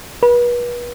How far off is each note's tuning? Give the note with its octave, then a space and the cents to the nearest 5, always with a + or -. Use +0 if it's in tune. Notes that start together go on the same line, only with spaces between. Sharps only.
B4 -35